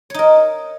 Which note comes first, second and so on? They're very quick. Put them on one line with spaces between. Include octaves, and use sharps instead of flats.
C#5 D#4 A#4